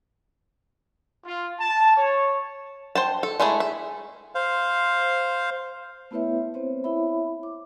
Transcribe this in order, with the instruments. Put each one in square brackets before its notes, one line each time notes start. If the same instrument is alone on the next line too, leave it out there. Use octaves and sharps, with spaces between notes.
[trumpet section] F4
A5
C#5
[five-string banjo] C5 G5 A5
A4
G#3 A3 E4 G#4
E5
[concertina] C5 F5
[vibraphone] A3 B3 E4 B4 C#5 E5
B3 C4 C5 C#5
E4 C#5 E5 B5
D6